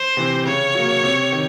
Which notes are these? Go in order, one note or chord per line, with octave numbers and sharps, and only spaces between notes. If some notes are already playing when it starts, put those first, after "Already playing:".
Already playing: C5
C3 E3
C#3 C#5
F#3 A#3
C3
D#3